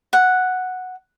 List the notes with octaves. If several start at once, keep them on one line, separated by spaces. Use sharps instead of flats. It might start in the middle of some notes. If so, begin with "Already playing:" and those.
F#5